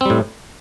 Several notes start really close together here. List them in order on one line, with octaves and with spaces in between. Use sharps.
C4 G3 A2